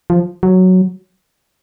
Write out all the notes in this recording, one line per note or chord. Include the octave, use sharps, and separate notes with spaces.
F3
F#3